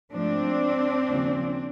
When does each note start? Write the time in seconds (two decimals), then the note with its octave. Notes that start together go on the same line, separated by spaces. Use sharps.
0.13 G#2 F3 A3 C4 D4
1.07 D#2 C#3 F3